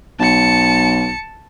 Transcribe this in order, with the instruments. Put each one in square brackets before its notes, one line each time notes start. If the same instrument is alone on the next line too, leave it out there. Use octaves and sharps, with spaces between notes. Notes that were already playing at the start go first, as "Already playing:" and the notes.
[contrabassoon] B1 [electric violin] A5 C#7